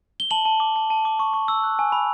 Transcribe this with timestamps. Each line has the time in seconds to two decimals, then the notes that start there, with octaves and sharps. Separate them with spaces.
0.20 G7
0.31 A5 F#7
0.45 A5
0.60 D6
0.76 A5
0.90 A5
1.05 D6
1.19 C#6
1.34 C#6
1.48 E6
1.63 F#6
1.79 G#5
1.92 B5